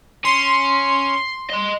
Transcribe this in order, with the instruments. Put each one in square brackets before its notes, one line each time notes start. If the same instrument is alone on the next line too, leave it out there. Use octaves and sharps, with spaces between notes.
[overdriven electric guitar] C#4 [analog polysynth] C6
[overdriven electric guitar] D#5 C6